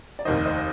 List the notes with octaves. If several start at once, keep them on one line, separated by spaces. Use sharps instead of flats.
D5
F1 D#2 D#3 C5 D#5
C5 D#5